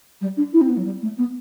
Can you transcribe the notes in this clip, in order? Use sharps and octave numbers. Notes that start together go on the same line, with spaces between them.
G3
D4
E4
C4
B3
F#3
G3
A3
B3